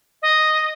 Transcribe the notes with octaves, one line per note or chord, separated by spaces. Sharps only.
D#5